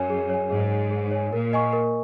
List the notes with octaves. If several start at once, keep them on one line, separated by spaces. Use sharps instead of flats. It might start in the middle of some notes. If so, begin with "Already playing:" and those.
Already playing: F#2 C#5 G#5
G#4
C#5 G#5
G#2 G#4
C#5 G#5
G#4
C#5 G#5
A#2 A#4
D#5 G#5 C#6
A#4